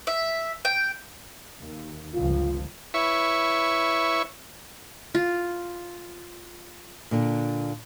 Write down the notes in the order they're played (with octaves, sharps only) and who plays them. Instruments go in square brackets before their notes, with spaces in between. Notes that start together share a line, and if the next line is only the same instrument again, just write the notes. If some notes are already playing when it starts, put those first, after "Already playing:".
[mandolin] E5
G5
[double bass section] D#2
[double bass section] G1 C#2 F3 [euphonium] F4
[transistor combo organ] E4 B4 C#5 E5 C#6
[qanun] F4
[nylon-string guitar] A#2 D3 D4